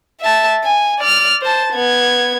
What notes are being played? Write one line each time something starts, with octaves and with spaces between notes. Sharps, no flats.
E5 A5
G#5
D5 F6
C5 A5
B3 G#6